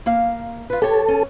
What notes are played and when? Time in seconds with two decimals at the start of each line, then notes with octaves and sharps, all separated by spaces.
0.06 A#3 F5
0.70 F4 B4
0.82 G4 A4 C#5
1.08 C#4